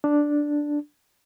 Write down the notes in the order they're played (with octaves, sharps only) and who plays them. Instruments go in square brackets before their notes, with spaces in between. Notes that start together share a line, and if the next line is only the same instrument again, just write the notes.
[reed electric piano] D4